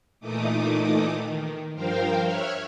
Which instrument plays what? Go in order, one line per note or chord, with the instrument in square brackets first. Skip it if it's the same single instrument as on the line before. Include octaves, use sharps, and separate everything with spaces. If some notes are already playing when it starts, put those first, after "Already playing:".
[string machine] A#2 E3 A3 D#4 D6 D#6
D#3
G2 F3 A#4 C5 F5 G5
C#5 E5 F6 F#6 G#6